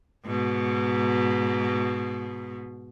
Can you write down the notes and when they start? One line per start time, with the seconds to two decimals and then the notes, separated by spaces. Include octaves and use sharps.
0.25 G#2 B2